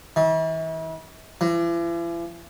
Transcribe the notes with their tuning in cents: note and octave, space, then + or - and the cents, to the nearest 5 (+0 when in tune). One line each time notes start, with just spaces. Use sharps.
E3 -40
E3 +45